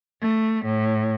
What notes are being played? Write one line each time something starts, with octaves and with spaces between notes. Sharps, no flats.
A3
A2